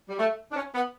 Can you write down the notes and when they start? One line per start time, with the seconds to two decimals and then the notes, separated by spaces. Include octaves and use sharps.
0.09 G3
0.19 A3
0.52 D4
0.56 C#4
0.75 B3